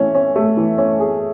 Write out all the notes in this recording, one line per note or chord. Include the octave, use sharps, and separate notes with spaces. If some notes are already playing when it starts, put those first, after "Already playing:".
Already playing: E3 A3 C#4
C#4
A3
E3
C#4
G#4